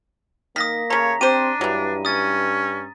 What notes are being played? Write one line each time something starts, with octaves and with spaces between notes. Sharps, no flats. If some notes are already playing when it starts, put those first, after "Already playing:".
D#3 A#3 D#6 A#6 B6
C#3 A3 C#5 A#5
C4 D4 G4 C5 D#7
G2 E3 F#3
C#4 D#6 A6